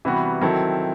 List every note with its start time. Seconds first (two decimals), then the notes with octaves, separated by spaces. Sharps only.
0.05 C3 E3 G3 B3 F#4
0.41 D#3 F#3 C4 E4 A4